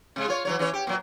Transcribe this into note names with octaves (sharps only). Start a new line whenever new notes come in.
C3 G#3
F4 C#5
E3 F#3 C#5
E3 C#4 C#5
G4
A#2 F#3